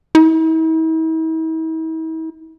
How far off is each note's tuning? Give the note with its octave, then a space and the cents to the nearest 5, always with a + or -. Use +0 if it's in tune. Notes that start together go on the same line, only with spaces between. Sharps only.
E4 -45